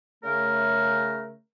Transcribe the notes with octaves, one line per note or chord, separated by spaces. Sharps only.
C#3 A3 A#4